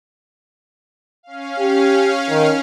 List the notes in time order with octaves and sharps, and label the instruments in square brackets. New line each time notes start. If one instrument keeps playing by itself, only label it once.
[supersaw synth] C#4 F5
[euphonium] G4
D#3